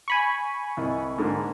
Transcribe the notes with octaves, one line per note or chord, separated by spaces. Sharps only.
G#5 B5 C#6
C2 D#5
G#2 D3 A#3